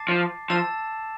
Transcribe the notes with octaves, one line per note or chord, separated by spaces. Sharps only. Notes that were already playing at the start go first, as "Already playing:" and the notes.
Already playing: A5 D6 A6 C7
F3
F3 A5 E6 A6 E7